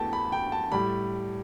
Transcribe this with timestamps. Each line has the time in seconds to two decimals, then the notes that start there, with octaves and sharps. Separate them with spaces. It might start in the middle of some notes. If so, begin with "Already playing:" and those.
Already playing: E2 E3 A3 G5 A5
0.13 B5
0.32 G5
0.52 A5
0.72 A2 G3 B5